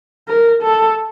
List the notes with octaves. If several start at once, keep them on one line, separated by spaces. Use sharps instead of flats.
A#4
A4